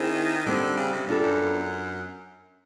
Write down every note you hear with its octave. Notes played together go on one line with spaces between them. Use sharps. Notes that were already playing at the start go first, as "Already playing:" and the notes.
Already playing: D#3 C4 E4 G#4
D3 G3 C4 D#4
C#3
C3
G2 B3 D4 F4 A4
F#2